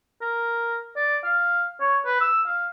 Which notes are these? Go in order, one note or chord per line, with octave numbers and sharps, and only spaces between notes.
A#4
D5
F5
C#5
B4
E6
F5